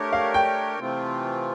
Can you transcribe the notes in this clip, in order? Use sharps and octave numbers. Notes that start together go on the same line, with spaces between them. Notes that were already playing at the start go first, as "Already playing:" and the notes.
Already playing: A3 D4 G4 A#4 C#5
F5
G5
C3 E3 A3 C4 F4